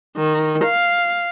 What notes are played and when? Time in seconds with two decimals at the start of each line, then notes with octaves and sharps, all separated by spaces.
0.16 D#3
0.64 F5